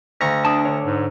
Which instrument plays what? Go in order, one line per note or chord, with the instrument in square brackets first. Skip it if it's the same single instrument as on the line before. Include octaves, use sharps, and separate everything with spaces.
[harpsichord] D2 A#5 C#6
[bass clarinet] D4 [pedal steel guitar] A5 D#6
[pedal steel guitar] D3 C#5
[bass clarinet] G#2